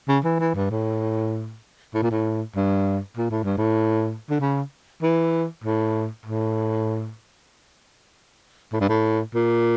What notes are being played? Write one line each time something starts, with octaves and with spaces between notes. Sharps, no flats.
C#3
E3
E3
G2
A2
A2
A#2
A2
G2
A#2
A2
G2
A2
D3
C#3
E3
A2
A2
A2
G2
A2
A#2